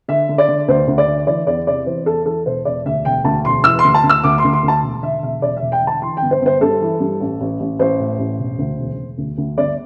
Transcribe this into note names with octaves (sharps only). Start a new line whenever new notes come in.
D3 E5
D3
D5
D3
D2 C5
D2
D5
D3
E3 D5
E2 D5
C3 D5
E3 C5
E2 A4
E3 A4
E1 C5
E1 D5
D2 E5
E1 G5
D2 A5
E1 C6
E3 E6
C6
D2
A5
D2
E6
D2 D6
C6
D2
C6
D2
A5
E1
D3 E5
E1 E5
E1 D5
E1 E5
G5
D3
A5
E3 C6
G1 G5
C5
G1 C5
G2 A4
E3
G2
A1
A1
A1
A1 C5
A2
A1
E1
D2
E1
E1
D2
D2
G1 D5